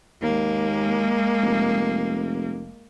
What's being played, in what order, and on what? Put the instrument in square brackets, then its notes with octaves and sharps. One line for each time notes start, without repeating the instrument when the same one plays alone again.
[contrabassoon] D#2 [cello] G#3 A#3
[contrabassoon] F1